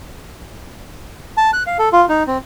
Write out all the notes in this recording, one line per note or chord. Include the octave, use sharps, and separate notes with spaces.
A5
F#6
F5
A4
F4
D#4
C4